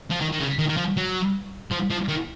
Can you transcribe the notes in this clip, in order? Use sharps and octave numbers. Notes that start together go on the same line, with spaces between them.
F3
D#3
D#3
C#3
D#3
D#3
F3
F#3
F3
F3
D#3